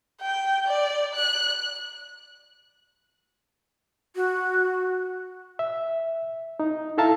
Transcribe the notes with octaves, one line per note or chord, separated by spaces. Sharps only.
G5
D5
F#6
F#4
E5
D#4
E4 A4 E5 F5 A5 A#5